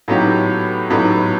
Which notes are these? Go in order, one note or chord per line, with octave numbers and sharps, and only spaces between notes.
A2 F#3 B3 D#4 G4
A2 F#3 B3 D#4 G4